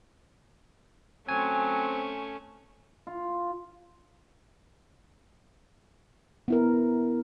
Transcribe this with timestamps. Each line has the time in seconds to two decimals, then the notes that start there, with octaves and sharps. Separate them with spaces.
1.29 F#3 A3 C4 C#4 G#5
3.07 F4
6.48 B3 E4 A#4